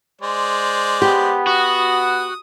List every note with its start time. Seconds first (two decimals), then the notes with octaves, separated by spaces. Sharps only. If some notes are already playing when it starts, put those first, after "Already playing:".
0.21 G#3 C5 D5
1.02 B3 G4
1.47 F#4 D#6